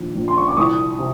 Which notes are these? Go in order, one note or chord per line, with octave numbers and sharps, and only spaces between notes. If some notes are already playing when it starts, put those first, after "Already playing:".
Already playing: A#1 D#3
A#1
C6
C#6
D6
C2 C#6 D#6
C3